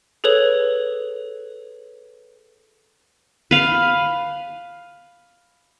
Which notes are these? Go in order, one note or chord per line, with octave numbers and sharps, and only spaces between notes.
G#4 A4 B4 C#5 F7 F#7
B4 F5